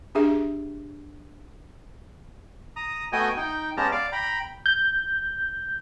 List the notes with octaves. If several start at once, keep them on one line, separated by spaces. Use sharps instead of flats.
D4 G4 G#4 E5
A#5 D#6
A3 B3 F#4 D#5 G5 G#5
D#4 G5
G#3 B3 C#4 G4 A5 A#5
D5 F5 D6
G5 A#5 B5
G6